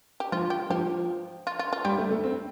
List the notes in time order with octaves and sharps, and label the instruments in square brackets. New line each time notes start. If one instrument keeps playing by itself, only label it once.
[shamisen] G4
[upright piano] F3 [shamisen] F4
[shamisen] G4
[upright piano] F3 [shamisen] G4
[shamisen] F4
F4
F4
[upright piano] G3 [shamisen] G4
[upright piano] A3
A3
C4